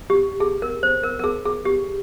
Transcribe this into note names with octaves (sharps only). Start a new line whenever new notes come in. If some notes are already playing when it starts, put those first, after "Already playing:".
G4
G#4
A#4
C5
A#4
A#4
G#4
G#4
G4